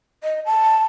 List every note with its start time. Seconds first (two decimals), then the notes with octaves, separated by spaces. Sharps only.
0.24 D#5
0.46 A5